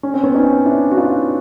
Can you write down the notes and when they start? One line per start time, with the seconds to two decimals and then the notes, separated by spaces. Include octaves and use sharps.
0.03 C#4
0.14 C4
0.23 B3 C#4
0.34 C#4 D#4
0.65 D4 E4
0.91 F#4
0.97 D#4 F4